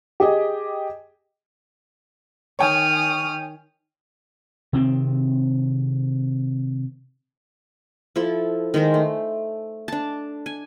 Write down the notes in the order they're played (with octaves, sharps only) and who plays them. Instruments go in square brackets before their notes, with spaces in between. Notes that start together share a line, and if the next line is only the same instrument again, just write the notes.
[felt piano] G4 G#4 D#5
[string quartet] D#3 D#6 F6 [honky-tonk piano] C#5 G5 G#5
[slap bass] C3 D#3 C4
[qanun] F3 E4 A4
D#3 G#3 A#4 C5
A3
D4 A5
G#5